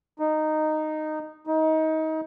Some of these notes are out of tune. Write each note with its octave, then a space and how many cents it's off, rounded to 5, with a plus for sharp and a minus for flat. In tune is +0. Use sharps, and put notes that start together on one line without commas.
D#4 -10
D#4 +25